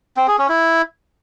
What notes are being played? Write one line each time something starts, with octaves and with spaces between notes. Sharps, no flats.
C4
G#4
C#4
E4